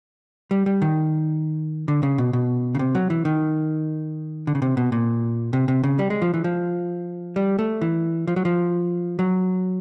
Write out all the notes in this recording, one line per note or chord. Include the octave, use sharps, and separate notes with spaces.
G3
G3
D#3
D3
C#3
B2
B2
C#3
C3
F#3
E3
D#3
D3
C#3
C3
B2
A#2
C3
C3
C#3
G3
G#3
F3
E3
F3
G3
A3
E3
F3
F#3
F3
F#3